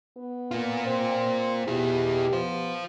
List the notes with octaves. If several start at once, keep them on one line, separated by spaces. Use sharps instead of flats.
B3
A#3 F4
C4
B2 E4 G4 G#4
B3 F4 C5